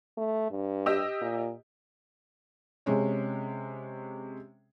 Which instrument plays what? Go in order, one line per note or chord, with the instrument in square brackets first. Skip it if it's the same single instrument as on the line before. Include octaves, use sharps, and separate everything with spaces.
[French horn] A3
G2
[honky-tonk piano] G4 D#5 E6
[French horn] A#2
[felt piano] C3 G#3 C#4